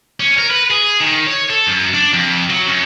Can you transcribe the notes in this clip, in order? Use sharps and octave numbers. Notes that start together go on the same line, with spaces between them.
C#4
A#4
B4
G#4
D#3
C#5
A4
F#2
D4
F2
F#3
F#2